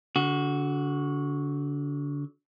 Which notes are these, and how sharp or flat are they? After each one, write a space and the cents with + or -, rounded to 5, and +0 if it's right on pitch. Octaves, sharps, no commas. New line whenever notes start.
D3 -30 F#4 +0